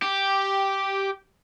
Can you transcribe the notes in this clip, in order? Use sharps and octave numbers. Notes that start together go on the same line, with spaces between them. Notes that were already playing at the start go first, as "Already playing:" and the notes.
G4